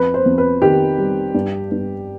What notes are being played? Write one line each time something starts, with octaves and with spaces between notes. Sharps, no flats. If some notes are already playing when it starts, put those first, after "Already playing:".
Already playing: F2 B4
C5
F2
B4
D#3 G4
G3
G2
G2